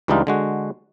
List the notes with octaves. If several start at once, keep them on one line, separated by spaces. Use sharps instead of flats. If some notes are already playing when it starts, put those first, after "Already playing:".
C#2 E3 G3 D4 D#4 F4
D3 G#3 F#4